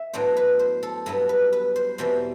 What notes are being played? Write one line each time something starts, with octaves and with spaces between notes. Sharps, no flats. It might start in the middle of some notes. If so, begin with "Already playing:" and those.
Already playing: E5
A2 F#3 B3 D4 C5
B4
C5
A4
G2 F#3 B3 A4
B4
B4
C5
E2 B2 G3 C4 C5